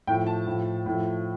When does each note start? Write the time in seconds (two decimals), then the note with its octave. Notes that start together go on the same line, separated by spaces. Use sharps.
0.07 A2 F3 G5
0.27 A5
0.47 A2 F3
0.86 A2 F3